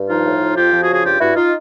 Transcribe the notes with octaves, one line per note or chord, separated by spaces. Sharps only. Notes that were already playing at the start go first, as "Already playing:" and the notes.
Already playing: G2
F3 D#4 F4
A2
F3
F2 F4 G4
F3
F#4 G#4
C#3
G#4
G2 F4 G4
G2 E4 F#4
D#4 F4